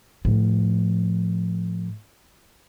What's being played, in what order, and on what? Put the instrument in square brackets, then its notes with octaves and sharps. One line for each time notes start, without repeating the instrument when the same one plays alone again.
[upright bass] A2 F3